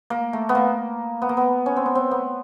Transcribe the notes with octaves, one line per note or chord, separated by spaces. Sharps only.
A#3
A3
B3
A#3
B3
A#3
B3
C#4
C4
B3
C4
B3